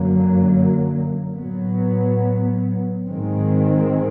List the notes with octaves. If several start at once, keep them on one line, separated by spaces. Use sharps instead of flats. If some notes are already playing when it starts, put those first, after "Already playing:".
Already playing: F#2 D3 F#3 A#3
A2 F#3 B3
G#2 D#3 G#3 C4